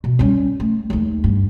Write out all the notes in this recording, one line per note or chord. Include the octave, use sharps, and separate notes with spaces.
B2
G3 C#4
A3
D#2 A3
G2